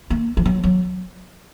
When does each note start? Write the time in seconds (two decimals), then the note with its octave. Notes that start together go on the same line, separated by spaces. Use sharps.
0.10 A#3
0.37 F3
0.46 F#3
0.64 F#3